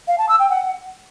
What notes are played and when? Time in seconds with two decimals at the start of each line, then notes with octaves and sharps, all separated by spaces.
0.08 F5
0.18 A5
0.29 E6
0.39 G5
0.50 F#5